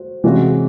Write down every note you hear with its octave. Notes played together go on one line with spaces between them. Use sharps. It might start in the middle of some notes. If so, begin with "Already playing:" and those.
Already playing: F#4 C5
C3 E3 G#3 C#4 F#4